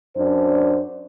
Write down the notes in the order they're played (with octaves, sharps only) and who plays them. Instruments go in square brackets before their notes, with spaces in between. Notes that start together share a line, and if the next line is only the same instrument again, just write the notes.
[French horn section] F#2 D4 C5